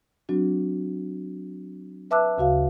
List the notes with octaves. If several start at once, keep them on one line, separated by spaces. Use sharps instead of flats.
F#3 C4 D4 F#4
B4 E5 A5 D6 E6 F#6
D2 C#3 F#4 F5